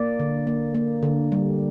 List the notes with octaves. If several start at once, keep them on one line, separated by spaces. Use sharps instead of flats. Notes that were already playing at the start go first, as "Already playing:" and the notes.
Already playing: A#3 D5
D3
A#3
A#3
D3
G3